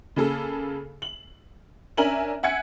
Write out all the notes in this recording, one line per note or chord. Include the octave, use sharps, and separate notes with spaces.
C#3 A#3 G#4 A4
F#7
C#4 D4 A#4 E5 G#5 F#7
E5 F#5 G#5 G#6 C#7